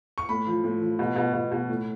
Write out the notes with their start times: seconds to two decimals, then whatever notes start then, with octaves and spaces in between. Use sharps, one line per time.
0.18 C#6
0.29 A2 B5
0.47 F3
0.64 A2
0.81 F3
0.99 B2
1.16 B2
1.34 B2
1.51 B2
1.69 A2